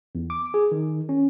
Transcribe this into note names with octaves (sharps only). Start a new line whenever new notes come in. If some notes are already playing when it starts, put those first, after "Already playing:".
E2
D6
G#4
D#3
C#4